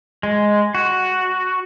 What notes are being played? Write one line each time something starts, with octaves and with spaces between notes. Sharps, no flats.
G#3
F#4